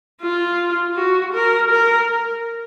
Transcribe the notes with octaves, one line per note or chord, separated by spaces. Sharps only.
F4
F#4
A#4
A#4